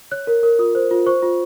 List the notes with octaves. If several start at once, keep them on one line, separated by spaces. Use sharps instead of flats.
C#5 F#6
A#4
A#4
F4 D#6
C5
F4
C5 C#6
F4